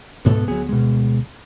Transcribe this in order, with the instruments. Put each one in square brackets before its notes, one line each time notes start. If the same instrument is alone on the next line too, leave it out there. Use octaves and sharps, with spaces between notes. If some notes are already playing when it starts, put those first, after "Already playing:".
[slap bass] D2 G#2 B2 [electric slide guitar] B3 A4
[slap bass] D2 B3 [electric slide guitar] F#3 G#4
[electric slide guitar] B2 G#3